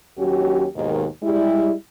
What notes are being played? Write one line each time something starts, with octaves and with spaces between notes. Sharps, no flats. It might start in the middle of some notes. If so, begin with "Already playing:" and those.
D#2 F#3 C#4 F#4 G4
D#2 G#2 B2 D#3
G3 G#3 E4